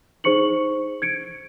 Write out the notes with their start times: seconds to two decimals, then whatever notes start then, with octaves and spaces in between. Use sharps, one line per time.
0.24 D#4 G#4 C5 C#6 C#7 F#7
1.02 G#6 C#7 D7